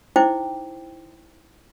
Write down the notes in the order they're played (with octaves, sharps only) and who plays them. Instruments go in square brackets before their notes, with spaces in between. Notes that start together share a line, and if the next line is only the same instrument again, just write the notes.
[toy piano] D#4 E4 C5 G5 D6